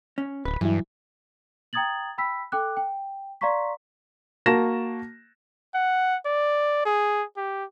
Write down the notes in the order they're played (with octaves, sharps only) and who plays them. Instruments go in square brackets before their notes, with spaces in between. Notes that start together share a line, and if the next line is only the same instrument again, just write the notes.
[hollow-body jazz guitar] C#4
[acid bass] D1 [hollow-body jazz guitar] B4
[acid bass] G2 [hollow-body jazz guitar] E3 [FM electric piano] F#3 E4
[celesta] G5 A#5 D#6 G#6 A6 F#7
G5 B5 E6 B6
A4 G5 D6 F#6
G5
D5 F5 A#5 C6 C#6 B6
[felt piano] A#3 F#4 A5 A#6 E7
[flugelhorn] F#5
D5
G#4
G4